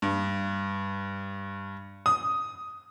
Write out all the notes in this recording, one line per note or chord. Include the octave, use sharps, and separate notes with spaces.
G2
D#6